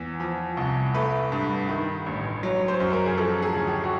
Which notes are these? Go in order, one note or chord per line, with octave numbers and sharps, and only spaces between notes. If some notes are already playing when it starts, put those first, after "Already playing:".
Already playing: E2 E3
F3
C2
A3 B4
G2
D#3
A1
F#3
C5
F#2
A#4
G#4
F3 A4
G#4
D2
G4
F#4